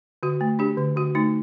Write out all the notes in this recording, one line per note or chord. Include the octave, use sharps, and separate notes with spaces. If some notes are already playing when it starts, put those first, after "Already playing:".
D3 F#4
A3
D4 G4
D3
D3 F#4
A3 D#4